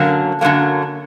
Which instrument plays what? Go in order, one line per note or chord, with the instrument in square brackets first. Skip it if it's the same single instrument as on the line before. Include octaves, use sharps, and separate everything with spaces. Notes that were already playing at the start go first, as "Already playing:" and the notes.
Already playing: [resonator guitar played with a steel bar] F#2 D3 F#3 A#3
F#2 D3 F#3 A#3